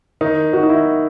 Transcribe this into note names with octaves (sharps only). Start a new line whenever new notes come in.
D#3 D#4
D#3 F#4
D#4
E4